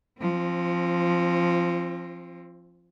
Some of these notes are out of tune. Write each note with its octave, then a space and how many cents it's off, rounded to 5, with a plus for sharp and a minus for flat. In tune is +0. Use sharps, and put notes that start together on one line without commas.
F3 -10 C4 +25